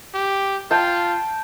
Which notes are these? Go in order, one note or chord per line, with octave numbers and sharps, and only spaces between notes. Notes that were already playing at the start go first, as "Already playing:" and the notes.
G4
F4 G5 A5